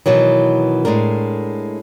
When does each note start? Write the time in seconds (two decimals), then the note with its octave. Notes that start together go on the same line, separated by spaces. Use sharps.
0.06 B2 D#3 E3 F#3
0.85 A2 G#3 D4 A#4